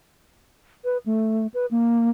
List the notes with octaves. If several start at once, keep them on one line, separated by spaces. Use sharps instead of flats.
B4
A3
B4
A#3